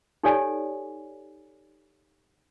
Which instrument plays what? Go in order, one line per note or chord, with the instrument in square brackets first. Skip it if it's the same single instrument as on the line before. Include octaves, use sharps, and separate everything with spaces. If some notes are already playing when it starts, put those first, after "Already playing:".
[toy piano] D#4 G4 A4 C#5 D5 G#5